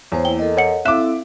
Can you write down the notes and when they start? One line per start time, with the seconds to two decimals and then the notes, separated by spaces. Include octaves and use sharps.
0.12 E2 C5 C#5
0.25 A#3 E4 G5 G7
0.39 A4 A#4 D#5
0.57 C#5 F#5 C#7
0.85 C4 E4 A4 E5 F5 D6 F#6 E7